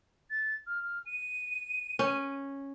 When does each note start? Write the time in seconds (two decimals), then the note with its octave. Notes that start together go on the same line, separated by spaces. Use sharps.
0.30 A6
0.67 F6
1.06 D#7
1.99 C#4